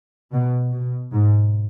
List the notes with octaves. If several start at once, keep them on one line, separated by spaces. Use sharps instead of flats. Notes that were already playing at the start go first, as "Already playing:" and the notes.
B2
B2
G#2